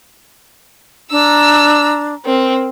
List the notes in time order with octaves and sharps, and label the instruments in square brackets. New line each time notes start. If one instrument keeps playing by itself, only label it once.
[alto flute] D4 [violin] A#5 E6
[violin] C4 [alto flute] A#4